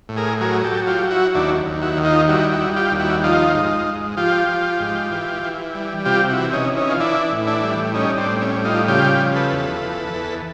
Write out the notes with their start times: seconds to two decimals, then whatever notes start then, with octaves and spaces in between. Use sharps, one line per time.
0.09 A2
0.17 G#4 A#4
0.41 F#3 G#4 A#4
0.64 G4 A4
0.71 F#3
0.87 F4 G4
1.03 F#3
1.11 E4 F#4
1.34 D#2 D4 E4
1.66 D#2
1.82 E4 F#4
1.97 D#3
2.05 D#4 F4
2.28 G3 E4 F#4
2.52 E4 F#4
2.61 G3
2.76 F4 G4
2.91 D#2
2.99 E4 F#4
3.23 F3 D#4 F4
3.54 G#2
3.86 G#2
4.17 F3 F4 G4
4.49 F3
4.80 G#2
5.11 E3
5.43 E3
5.75 G3
6.05 C3 F4 G4
6.29 E4 F#4
6.37 E3
6.53 C#4 D#4
6.69 E3
6.77 C#4 D#4
6.91 F4
7.00 E3 D4 E4
7.32 A2
7.47 D4 E4
7.63 G3
7.94 G3 C#4 D#4
8.17 C4 D4
8.26 A2
8.41 C#4
8.56 G3
8.65 D#4 F4
8.88 C#3 F4 G4
9.20 F3
9.35 A4 B4
9.52 E2
9.83 E2
10.14 E2